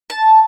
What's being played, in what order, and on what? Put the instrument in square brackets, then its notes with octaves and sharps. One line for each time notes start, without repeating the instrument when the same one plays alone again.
[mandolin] A5